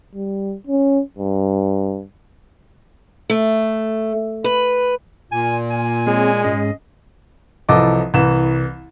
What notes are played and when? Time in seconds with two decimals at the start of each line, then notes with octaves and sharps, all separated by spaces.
0.15 G3
0.67 C#4
1.18 G2
3.30 A3
4.44 B4
5.32 A#2 G#5
5.70 G#5
6.07 G#3 C4 G#4 C#5
6.43 G#2 C#4 G#4 D#5
7.69 C2 E3 F3 A4 D#5 D6
8.14 C2 E3 E7